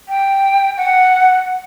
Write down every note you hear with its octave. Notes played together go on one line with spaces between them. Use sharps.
G5
F#5